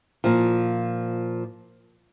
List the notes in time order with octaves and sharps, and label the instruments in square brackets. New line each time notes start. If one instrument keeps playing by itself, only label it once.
[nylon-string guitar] A#2 F3